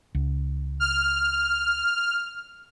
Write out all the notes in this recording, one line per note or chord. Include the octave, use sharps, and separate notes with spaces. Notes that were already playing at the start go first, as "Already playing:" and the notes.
C#2
F6